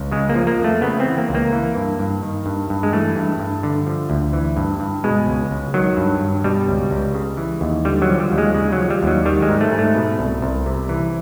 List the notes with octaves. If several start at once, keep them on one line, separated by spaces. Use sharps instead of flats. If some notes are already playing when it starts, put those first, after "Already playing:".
Already playing: C#2
C#3 G#3
A#3
F3
A#3
F2
A3
C#3 B3
C4
E3
A#3
C#2
A#3
E3
G2
G2
D#3
G2
G2
G#3
E3 A3
G2
G2
D3
F3
D2
E3
G2
G2
B2 G#3
C#2
C#2
D#3 F#3
G2
G2
B2 G3
C#2
C#2
C#3
E3
D#2
D3 G3
F#3
F3
G3
D#2
G#3
C#3 G#3
F#3
F3
G3
D#2 F#3
D#3 G3
G#3
G#2
A3
G#2
A3
B2
C2
C2
C3
E3